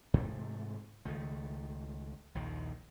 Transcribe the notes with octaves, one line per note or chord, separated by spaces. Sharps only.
G#2 C3 E3 A3
C#2 D#3 A3
A#1 D#2 D#3